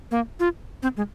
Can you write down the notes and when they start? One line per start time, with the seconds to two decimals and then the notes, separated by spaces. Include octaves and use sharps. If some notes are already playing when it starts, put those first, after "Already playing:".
0.11 A#3
0.40 F4
0.83 C4
0.97 G#3